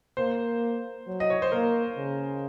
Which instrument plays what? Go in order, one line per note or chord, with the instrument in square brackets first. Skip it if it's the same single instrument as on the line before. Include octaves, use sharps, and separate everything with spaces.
[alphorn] A#3 [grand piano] C5
[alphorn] F#3
[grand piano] D#5
C#5
C5
[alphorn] A#3 [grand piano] A#4
[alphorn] C#3